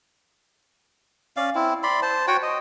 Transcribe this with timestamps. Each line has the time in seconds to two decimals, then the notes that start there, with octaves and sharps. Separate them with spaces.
1.37 C#4 D5 F5
1.55 C4 E4
1.83 D5 B5 C6
2.02 C5 A5
2.28 F#4 C#5 F#5 G5
2.42 D#5